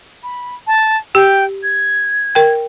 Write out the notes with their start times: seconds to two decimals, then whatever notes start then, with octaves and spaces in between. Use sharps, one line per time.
0.23 B5
0.67 A5
1.15 G4 G5
1.63 G#6
2.35 A#4 G5